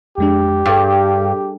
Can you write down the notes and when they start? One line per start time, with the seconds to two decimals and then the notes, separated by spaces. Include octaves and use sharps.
0.18 F2 G#3 D4 G4
0.66 G2 G#4 A4